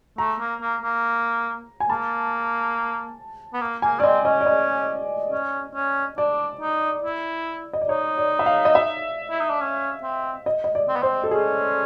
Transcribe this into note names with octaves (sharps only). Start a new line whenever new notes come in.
A3 A#5
A#3
A#3
A#3
G#5
A#3 A5
B3
A#3
A#3 G#5
C#4 D5
C4 D#5
C#4 D#5
D5
D#5
C#4
C#4
D4 D5
D#4
E4
D#5
D5
D#4 C#5
D5
E5
F5
D#5
E5
E4
D#4
D4
C#4
C4
D#5
D#5
D5
C4
B3
C4 C5
A4
C#4 G#4